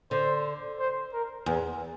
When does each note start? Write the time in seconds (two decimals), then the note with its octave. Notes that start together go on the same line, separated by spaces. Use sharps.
0.11 D3 C5
0.79 C5
1.13 A#4
1.46 E2